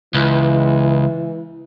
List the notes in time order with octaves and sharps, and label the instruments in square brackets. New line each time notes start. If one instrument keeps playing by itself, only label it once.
[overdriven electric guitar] C#2 [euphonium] E3